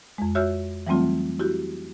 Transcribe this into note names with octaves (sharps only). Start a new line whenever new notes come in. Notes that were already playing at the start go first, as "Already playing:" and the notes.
F2 G#3
F#4 C#5 E5 E6 F6 G6
E3 F#3 G3 A3 C4 F4
E4 F#4 G4